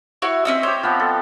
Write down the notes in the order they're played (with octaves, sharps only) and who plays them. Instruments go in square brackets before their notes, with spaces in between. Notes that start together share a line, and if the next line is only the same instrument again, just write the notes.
[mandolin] E4 F#4 C#5
[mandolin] C4 C#4 E6 [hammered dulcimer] D#5 E5
[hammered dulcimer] G4 C#5 [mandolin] C5
[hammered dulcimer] F3 B3 C4
A4